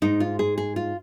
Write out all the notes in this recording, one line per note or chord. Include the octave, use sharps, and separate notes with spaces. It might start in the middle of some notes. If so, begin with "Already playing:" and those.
G#2 G#3 D#4
F4
G#4
G#4
F4